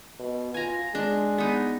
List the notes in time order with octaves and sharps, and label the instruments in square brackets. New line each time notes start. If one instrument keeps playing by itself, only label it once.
[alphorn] B2
[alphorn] F4 [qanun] G#5 A#5
[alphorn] G#3 [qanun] D4
[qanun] B3 D#4